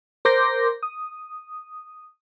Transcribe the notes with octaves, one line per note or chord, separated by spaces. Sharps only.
A#4 C5 C6 D6 G6 A#6
D#6